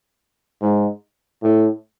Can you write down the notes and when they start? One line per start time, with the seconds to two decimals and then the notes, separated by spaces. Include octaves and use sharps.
0.61 G#2
1.42 A2